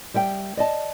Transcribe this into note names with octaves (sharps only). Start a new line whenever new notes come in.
G3 E5 G5
D5 D#5 A5